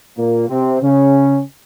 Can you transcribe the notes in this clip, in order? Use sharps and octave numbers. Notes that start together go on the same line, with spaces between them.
A#2 A#3
C3 C4
C#3 C#4